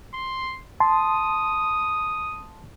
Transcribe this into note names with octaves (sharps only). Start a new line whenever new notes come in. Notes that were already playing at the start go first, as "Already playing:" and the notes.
C6
A5 C6 D#6